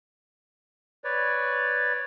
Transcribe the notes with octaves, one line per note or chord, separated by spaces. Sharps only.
B4 C#5 D5